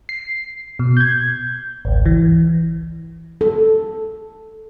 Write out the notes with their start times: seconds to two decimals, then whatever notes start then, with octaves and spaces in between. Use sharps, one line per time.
0.09 C7
0.79 B2
0.97 G6 G#6
1.85 G#1 C#2
2.06 E3
3.41 A4